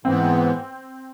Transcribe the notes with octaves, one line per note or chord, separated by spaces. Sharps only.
G#2 E3 G#3 B3 C4